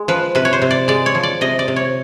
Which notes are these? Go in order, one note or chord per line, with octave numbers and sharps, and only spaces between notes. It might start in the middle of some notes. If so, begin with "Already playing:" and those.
Already playing: G#3
F3 B4
C3 B4
C#5
C5
C3
D5
G#3 D5
C#5
F3
D5
C3 D#5
D5
C3
C#5